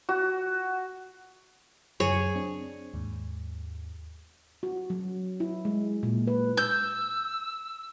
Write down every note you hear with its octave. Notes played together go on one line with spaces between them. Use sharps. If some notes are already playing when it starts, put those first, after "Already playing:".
F#4
F#2 C#3 F#3 G#4 C#5
C4 D4
D#2 G#2
F#4
F#3
E4
G#3
A#2
B4
E6 G6